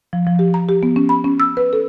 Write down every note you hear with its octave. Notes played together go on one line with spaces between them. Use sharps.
F3
F3
G4
A#5
G4
B3
C#4
B5
C#4
E6
B4
A4